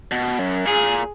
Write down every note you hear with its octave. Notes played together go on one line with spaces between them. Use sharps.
B2
F#2
A#2 G#4